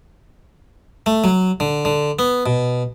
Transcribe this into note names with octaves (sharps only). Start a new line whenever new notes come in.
A3
F#3
D3
D3
B3
B2